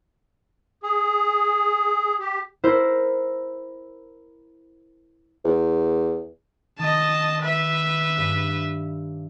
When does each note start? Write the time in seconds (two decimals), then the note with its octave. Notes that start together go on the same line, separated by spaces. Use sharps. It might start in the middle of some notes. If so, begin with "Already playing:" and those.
0.83 G#4
2.20 G4
2.64 E4 A#4 C5
5.44 E2
6.79 D#3 D#5 A5
7.42 B4 E5
8.18 G2